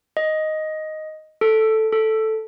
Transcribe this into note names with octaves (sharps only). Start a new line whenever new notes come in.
D#5
A4
A4